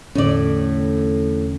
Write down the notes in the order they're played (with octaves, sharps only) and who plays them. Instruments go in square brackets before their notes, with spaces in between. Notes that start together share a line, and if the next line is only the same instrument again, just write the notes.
[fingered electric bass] E2 D3 C#4 [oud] A2 D5